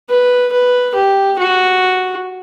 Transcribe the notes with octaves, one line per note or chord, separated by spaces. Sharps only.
B4
B4
G4
F#4